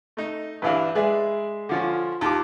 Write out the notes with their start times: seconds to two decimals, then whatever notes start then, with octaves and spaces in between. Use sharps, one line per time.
0.17 A3 D#4
0.62 G2 E3 D4 B4 E5 F5
0.95 G#3 G#4 B4 D5 E5
1.69 D3 F3 C#4
1.82 F4
2.21 D#2 F4 G4 A5 D6